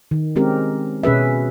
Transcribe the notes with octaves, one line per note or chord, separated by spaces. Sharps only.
D#3
G#3 C4 C#4 G4 A#4
B2 C#4 G#4 B4 E5